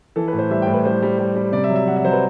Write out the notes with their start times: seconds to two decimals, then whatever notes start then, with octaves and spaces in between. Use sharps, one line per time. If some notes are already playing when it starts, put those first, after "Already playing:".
0.16 E3 A4
0.28 B4
0.33 A2
0.39 C5
0.50 G3 E5
0.62 G5
0.67 A2
0.74 B4
0.85 G3 C5
1.02 G3
1.18 G3
1.36 G3
1.52 C3 D5
1.64 E5
1.70 F#3
1.76 E5
1.87 F#3 F#5
1.96 E5
2.04 F#3 C5
2.12 B4